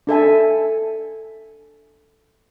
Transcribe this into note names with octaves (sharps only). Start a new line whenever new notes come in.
D4 A4 E5 G#5